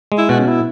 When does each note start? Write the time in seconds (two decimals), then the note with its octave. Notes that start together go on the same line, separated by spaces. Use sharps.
0.12 G#3
0.18 E4
0.29 B2 F#4
0.39 C#4
0.48 E4